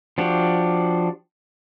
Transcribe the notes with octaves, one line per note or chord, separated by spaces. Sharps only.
F3 D4 F#4 G4